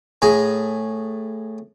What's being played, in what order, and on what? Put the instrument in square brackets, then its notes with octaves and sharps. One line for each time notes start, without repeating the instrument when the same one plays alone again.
[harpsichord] A2 G#4 A#5